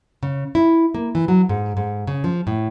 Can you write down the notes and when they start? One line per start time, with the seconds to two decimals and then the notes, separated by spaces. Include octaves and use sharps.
0.23 C#3
0.55 E4
0.95 A#3
1.15 E3
1.28 F#3
1.49 G#2
1.77 G#2
2.07 C#3
2.24 F3
2.47 A2